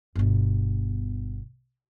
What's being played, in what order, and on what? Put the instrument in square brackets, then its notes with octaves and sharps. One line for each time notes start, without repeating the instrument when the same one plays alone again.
[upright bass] G1 B2